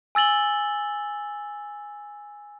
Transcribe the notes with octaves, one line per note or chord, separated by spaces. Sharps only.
G#5 E6 A6 F#7 G7